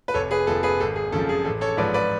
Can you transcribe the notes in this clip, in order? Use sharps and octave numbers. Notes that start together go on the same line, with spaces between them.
B4
F1 A4 C#5
G#4 B4
F2 F3 A4
G#4 B4
G#1 A4
G#4
F#2 C#3 F3 A4
G#4
A1 A4
A4 C#5
G#2 F3 B4 D5
B4 D5